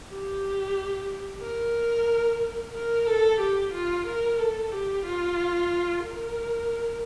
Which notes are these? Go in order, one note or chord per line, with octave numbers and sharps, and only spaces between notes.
G4
A#4
A#4
A4
G4
F4
A#4
A4
G4
F4
A#4